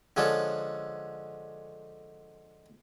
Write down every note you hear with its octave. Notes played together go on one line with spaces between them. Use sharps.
D3 F3 G#3 C#4 A4